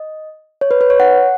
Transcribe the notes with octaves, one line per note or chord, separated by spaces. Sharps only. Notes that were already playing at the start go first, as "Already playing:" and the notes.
Already playing: D#5
C#5
B4
B4
C#5
F#5